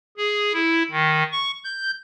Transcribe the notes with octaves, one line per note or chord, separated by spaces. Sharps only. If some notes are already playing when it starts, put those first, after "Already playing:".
G#4
E4
D#3
C#6
G6